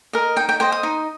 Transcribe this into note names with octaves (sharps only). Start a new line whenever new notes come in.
A#4 D#5
D#4 G5
G5
C5 D#5 G5
D#6
D#4